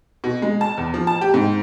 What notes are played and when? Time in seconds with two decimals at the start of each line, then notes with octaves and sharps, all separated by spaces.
0.24 B2
0.42 G#3
0.61 A5
0.78 E2
0.94 F3
1.07 A5
1.21 G4
1.34 G#2